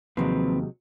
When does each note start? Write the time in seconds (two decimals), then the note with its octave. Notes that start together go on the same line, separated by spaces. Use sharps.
0.17 D#2 C3 F3 F#3 G#3 C4 B4